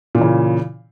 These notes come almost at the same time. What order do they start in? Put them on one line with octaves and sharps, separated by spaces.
A#2 E3 C#3